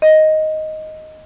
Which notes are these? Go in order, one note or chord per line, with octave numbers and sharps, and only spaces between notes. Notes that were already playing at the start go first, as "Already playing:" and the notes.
D#5